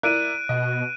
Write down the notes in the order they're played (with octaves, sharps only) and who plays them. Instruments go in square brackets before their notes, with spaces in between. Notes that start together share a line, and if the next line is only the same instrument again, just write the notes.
[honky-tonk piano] E4 A#4 D5 [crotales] F#6 D7 D#7
[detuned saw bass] B2 [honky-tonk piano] D#5